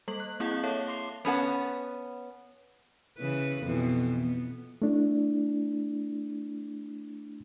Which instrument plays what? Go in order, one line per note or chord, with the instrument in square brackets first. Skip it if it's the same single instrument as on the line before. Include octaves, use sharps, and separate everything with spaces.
[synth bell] G3 A#3 A4 F#7
F#6
A#3 C4 E4 G#4 F5 F#5
A4 C#5 E5 F5 A5
F5 C6 D6 C7
[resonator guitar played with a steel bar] B3 C#4 A4 F#5 A5
[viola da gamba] C#3 E3 B4
F2 B2 E3
B3
[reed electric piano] A3 D4 E4